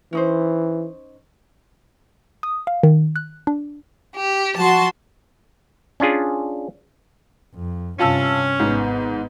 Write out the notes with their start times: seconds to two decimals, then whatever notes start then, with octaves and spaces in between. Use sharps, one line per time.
0.13 E3 C#4 D#4 C5
2.43 D#6
2.67 F5
2.83 D#3
3.16 F#6
3.47 D4
4.15 G4
4.56 F3 F#4 A5 C6
6.00 C#4 D4 F4 G#4
7.55 F2
7.99 G2 C3 C#4 F4 A5 E6
8.60 G#1 G#2 B3